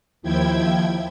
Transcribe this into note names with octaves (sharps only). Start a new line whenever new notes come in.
D#2 F3 E4 G5 G#6